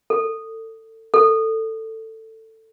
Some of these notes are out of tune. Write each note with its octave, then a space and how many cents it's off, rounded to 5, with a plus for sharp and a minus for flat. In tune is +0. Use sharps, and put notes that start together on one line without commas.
A4 +25
A4 +15